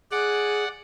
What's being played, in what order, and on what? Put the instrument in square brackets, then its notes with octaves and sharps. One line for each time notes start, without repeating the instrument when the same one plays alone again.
[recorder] G#4 [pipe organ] D5 F#5